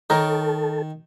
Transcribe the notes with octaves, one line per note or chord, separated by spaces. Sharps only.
D#3 D#4 A4 A#4 C#5